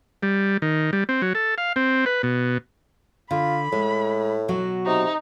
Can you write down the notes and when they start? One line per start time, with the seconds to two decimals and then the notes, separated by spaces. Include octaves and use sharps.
0.23 G3
0.62 D#3
0.93 G3
1.09 C4
1.22 F#3
1.35 A4
1.58 F5
1.76 C4
2.06 B4
2.23 B2
3.31 D3 F4 B5
3.72 A2 G#3
4.48 B2 F#3 F#4
4.86 C3 D#4